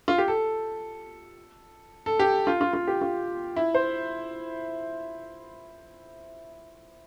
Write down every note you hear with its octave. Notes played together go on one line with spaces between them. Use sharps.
F4
G4
A4
A4
G4
F4
F4
F4
G4
F4
E4
C5